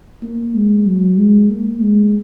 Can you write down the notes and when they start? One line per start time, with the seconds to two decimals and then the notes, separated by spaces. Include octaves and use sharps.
0.23 A#3
0.55 G#3
0.86 F#3
1.18 G#3
1.50 A#3
1.82 G#3